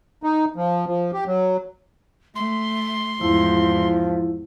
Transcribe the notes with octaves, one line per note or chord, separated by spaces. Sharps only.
D#4
F3
F3
G4
F#3
A3 C6
E2 G#2 F3 E4